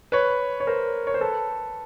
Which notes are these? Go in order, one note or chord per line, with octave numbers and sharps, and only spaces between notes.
B4 C#5
C#5
A#4 C5
C#5
C5
A4 B4